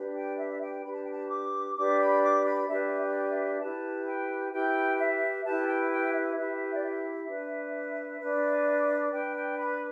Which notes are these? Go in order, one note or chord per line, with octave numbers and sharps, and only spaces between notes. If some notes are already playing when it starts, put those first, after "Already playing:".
Already playing: D4 G4 B4
G5
E5
G5
D4 G4 B4 B5
A5
G5
A5
D6
D4 G4 B4 D6
B5
D6
B5
D4 G4 B4 E5
E5
E4 G4 B4 A5
G5
E4 G4 B4 G5
E5
E4 G4 B4 A5
G5
G5
E5
E4 G4 B4 E5
D5
E5
D4 B4
D4 B4
D4 B4 G5
G5
B5